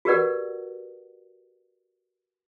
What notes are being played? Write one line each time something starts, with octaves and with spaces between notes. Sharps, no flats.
F#4 G4 A#4 B4 D5 F#5